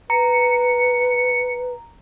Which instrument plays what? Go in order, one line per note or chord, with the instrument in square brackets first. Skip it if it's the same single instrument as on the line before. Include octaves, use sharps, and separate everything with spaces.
[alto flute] B4 [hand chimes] A#5 [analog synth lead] C#7